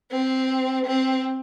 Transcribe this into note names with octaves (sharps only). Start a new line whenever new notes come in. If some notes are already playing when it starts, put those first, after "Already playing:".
C4
C4